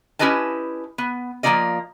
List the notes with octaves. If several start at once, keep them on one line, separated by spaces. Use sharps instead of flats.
C#4 E4 G4 B4 D#5 A5
B3
F3 F#3 A#3 F4 D5 D#5